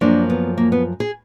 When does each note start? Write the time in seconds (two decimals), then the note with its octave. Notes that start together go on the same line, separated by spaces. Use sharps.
0.01 F#2 F3 A#3 D4
0.30 B3
0.58 A#3
0.72 B3
1.00 G#4